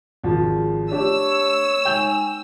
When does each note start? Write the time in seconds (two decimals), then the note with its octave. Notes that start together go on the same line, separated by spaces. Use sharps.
0.24 G#1 F3 F#4 G#4
0.92 A3 D4 G4 C#5 E6
1.85 G#3 D#4 G5 G#5 G6 F7